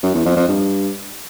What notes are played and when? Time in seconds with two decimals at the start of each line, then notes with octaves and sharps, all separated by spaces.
0.03 F#2
0.14 E2
0.26 F2
0.37 F2
0.48 G2